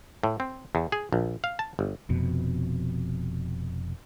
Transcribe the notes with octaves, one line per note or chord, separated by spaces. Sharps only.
A2
C4
E2
G#4
A#1
F5
A5
G1
F1 F2 B2